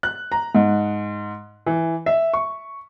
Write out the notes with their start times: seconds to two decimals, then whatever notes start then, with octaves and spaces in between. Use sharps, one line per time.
0.03 F#6
0.32 A#5
0.55 G#2
1.66 E3
2.06 E5
2.34 C#6